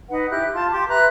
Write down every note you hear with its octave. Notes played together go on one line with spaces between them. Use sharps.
D#4 B4 F#5
E4 G4 F#6
F4 A5 C6
G4 C6 D6
B4 E5 A#5 F#6